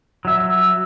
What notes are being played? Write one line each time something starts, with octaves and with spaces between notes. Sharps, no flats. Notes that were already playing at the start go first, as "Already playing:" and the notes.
F#3 E5